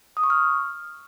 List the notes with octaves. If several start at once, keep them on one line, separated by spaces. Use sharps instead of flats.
D#6
C#6
F6